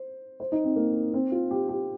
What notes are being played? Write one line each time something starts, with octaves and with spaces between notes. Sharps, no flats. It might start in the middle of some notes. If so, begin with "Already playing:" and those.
Already playing: C5
C5
D#4
C4
A#3
C4
F4
G4
G4